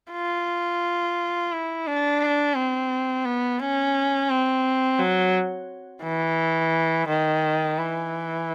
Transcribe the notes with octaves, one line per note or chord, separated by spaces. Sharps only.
F4
E4
D4
C4
B3
C#4
C4
F#3
E3
D#3
E3